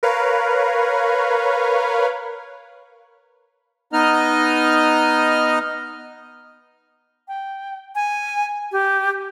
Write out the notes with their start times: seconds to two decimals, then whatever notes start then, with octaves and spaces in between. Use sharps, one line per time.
0.03 A#4 B4 C#5 F5
3.93 B3 D#4 D#5 F6
7.28 G5
7.95 G#5
8.72 G4